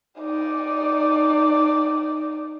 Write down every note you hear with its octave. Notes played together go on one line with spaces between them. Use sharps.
D#4 D5